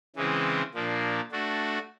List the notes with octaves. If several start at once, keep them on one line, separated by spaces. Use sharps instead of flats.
C#3 E3 G#3 C4 E4
A#2 F3 A#3 D4
A3 D4 F#4